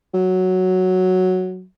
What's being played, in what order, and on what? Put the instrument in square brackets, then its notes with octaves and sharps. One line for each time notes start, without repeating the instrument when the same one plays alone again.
[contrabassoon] F#3